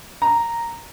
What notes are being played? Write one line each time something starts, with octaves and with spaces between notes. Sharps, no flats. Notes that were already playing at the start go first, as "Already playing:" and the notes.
A#5